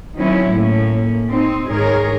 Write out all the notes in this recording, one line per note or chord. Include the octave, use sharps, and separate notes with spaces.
D#3 F#3 C4 C#4 E4
A2 A#3 C#4
C4 D#4 C5
G#2 D#3 G#4 A#4 C#5